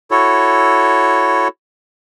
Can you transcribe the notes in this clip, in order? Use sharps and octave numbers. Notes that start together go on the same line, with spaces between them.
E4 F#4 A4 C#5